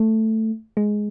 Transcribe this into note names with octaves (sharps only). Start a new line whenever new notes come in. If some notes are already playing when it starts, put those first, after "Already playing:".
Already playing: A3
G#3